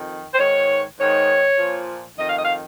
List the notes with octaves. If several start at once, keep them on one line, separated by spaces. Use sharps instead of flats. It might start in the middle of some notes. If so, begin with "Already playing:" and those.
Already playing: F2 D#3
C5
G#2 D#3 C#5
G#2 D#3 C#5
A#2 F3
F2 D#3 D#5
F5
D#5
F5